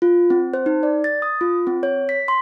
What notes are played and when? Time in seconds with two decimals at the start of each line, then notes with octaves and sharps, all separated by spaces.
0.02 F4
0.30 C4
0.54 C5
0.66 D#4
0.83 D5
1.04 A6
1.22 D#6
1.41 F4
1.67 C4
1.83 C#5
2.09 B6
2.28 C6